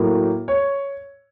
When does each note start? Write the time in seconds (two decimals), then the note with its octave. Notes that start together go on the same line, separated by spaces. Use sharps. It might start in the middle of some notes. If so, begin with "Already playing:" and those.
Already playing: A2 F#3 A#3
0.48 C#5